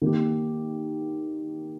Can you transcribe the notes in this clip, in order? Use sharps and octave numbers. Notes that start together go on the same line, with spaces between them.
D#3 A#3 G4